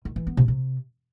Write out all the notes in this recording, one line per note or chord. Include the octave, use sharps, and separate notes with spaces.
D#3
E3
B3
C3
C3